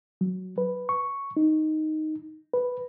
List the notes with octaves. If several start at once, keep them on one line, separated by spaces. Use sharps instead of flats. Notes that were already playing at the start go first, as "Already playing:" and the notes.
F#3
B4
C#6
D#4
B4